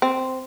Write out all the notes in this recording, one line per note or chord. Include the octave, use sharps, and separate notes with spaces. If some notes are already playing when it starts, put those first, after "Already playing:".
C4